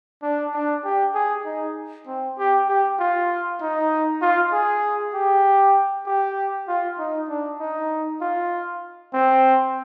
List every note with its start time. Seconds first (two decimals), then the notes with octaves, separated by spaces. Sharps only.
0.22 D4
0.54 D4
0.84 G4
1.15 G#4
1.45 D#4
2.07 C4
2.38 G4
2.69 G4
2.99 F4
3.61 D#4
4.21 F4
4.53 G#4
5.14 G4
6.06 G4
6.68 F4
6.98 D#4
7.29 D4
7.60 D#4
8.21 F4
9.13 C4